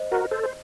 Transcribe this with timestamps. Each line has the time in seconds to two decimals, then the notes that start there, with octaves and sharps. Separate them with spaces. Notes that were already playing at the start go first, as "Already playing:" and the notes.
Already playing: C5 D#5
0.12 F#4 A#4
0.31 A4 C5
0.43 C5